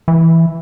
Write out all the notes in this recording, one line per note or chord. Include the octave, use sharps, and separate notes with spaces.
E3